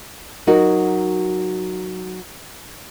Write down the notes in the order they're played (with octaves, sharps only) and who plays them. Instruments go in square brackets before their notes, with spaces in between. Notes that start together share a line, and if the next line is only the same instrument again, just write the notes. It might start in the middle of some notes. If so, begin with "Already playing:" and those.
[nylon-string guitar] F#3 D#4 F#4 A#4